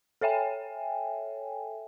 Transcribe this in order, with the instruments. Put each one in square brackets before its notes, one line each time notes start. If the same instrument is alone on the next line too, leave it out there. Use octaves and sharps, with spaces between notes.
[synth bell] A4 C#5 E5 G5 G#5